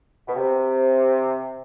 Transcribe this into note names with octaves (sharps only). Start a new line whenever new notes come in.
B2
C3